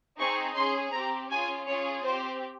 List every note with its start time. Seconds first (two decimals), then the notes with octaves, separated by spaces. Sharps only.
0.19 C4 D#4 G#4 C#6
0.56 C#4 G#4 C6
0.92 C4 G4 A#5
1.30 C#4 F4 G#4 G#5
1.67 C#4 F4 G#4 C#5
2.04 C4 G4 C5